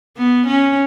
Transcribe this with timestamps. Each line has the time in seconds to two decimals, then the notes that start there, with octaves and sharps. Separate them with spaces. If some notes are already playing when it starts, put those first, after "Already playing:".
0.17 B3
0.46 C#4